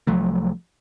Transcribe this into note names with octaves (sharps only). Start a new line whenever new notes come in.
C2 F3 F#3 A3